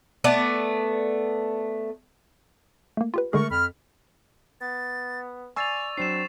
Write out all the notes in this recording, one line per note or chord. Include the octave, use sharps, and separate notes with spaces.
A3 B3 D5
A3 A#3
F4 G4 B4
D3 G#3 A3 G#4 A#4 C#6
F2 B5 F6
B3 A6
D5 G#5 C#6 E6 A6 C7 F7
F#3 C4 D4 C7 E7